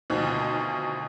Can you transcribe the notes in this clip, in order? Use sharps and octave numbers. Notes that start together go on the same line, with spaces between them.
D2 B2 D#3 F3